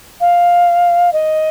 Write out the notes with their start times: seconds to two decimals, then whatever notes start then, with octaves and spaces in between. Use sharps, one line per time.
0.20 F5
1.13 D#5